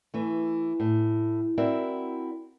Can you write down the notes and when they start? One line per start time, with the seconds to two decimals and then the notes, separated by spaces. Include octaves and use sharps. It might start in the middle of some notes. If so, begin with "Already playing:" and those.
0.14 E3 A3
0.80 A2
1.58 C4 E4 F#4 A#4 D5 E5